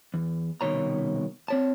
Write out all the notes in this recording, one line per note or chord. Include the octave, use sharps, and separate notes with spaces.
E2
C2 B2 D#3 C#5 A#5
C4 C#5 A5